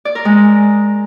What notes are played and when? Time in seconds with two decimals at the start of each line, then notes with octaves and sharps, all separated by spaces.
0.05 D5
0.15 A#4
0.25 G#3